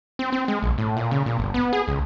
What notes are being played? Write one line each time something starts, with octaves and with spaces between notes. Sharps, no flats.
C4
C4
G#3
A#1
A2
A#2
C#3
A#2
G1
B3
G#4
C#2